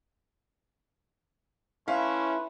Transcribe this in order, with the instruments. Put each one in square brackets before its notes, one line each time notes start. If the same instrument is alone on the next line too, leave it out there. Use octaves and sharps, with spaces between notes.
[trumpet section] A3 B4 C6 [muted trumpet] C#4 [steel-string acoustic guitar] E4 [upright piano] F5